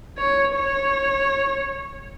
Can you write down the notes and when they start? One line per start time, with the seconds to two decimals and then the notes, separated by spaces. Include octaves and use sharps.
0.18 C#5
0.57 C#5